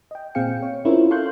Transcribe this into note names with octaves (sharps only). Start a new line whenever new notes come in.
D#5 G5
A#2 C4 G#4 F5 G5 C#7
C#5
C#4 E4 F4 A#4 C5 C#5
A4 F5 C6 C#6 F#6 G6